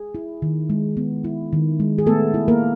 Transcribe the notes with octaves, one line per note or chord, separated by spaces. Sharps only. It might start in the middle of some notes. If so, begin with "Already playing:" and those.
Already playing: G#4
E4
D#3
G#3
B3
E4
D#3
G#3
G#4
A3 B3 A4
E4
A#3 A#4